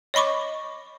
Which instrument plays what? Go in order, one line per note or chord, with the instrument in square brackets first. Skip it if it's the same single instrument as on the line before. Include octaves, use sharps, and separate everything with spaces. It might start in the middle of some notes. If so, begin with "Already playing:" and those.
[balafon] C#5 D#5 B5 C#6 D6